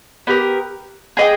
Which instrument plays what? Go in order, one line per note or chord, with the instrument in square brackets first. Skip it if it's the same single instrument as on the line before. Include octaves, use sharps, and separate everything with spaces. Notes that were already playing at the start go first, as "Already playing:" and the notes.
[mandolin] B3 G4 A#4
G#4 D#5 G5